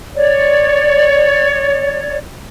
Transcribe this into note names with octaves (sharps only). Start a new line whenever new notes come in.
C#5 D5